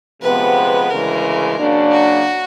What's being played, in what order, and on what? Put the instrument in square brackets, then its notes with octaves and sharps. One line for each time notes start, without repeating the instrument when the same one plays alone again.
[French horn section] D2 C3 F3 G#3 B3 [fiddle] B4
[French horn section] D2 C#3 E3 G#3 [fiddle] A#4
[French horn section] C#3 F#3 A#3 D4
[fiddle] F#4